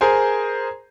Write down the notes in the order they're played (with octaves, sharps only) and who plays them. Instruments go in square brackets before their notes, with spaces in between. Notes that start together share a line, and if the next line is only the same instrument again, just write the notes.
[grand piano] G#4 A#4 C5 G#5